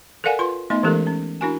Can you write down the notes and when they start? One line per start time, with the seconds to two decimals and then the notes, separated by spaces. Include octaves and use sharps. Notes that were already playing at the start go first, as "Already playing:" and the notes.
0.24 A4 A#4 D5 F5 F#5 G#5
0.39 F4 B4 C6
0.70 A3 B3 D#4 D#5 C6
0.83 E3 G#3 C#4 G4 A4 A#4
1.07 C#4
1.41 D4 E4 F#4 A#4 G#5